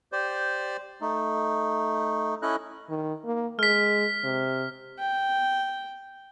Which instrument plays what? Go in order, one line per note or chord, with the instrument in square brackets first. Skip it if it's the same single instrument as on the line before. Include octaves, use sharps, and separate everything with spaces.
[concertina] G4 C5 D5
A3 D#4
C#4 E4 A4 D#5 F#6
[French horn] D#3
A#3
[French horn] G#3 [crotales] F6 B6
[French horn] C3
[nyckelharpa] G5